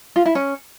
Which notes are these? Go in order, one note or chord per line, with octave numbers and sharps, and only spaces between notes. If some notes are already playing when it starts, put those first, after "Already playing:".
F4
E4
C#4